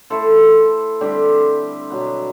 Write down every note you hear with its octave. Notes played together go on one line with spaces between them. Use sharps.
A3 E4 A4 C5
D3 G3 C4 G4
B2 F#3 B3